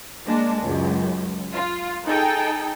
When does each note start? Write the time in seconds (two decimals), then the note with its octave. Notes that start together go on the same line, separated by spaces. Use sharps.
0.25 G#3 A#3 D4
0.62 C#2 F#2
1.53 F4
2.06 D#4 G#4 A4 G5